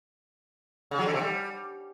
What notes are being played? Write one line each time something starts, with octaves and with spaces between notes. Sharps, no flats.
C#3
F#3
D3
C3
G3